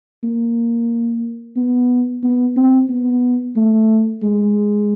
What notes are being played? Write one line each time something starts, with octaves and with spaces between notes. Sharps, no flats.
A#3
B3
B3
C4
B3
A3
G#3